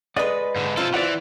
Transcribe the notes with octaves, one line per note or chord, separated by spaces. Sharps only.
G#3 B4 D5 D#5 F#5
G#2 D3
C3 C4 F4 A4
E3 C5 D5 F#5